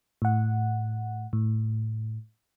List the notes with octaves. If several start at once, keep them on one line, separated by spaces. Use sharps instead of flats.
A2 F#5
A2